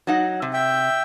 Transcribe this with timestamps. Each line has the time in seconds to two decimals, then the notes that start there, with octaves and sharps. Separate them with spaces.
0.07 F#3 D#4 F#5
0.42 C3
0.53 E5 G5